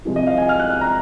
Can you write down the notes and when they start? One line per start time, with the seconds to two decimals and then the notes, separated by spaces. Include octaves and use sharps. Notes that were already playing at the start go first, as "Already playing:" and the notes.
0.05 C2 C3 F3 G#3
0.16 D#5
0.27 F5
0.38 G#5
0.49 F6
0.60 F#6
0.70 F6
0.81 A#5